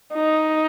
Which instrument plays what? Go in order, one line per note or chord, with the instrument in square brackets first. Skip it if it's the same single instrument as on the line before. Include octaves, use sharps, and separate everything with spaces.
[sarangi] D#4